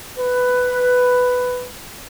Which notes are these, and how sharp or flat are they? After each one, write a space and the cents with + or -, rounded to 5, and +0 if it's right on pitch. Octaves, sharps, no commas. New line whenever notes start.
B4 +10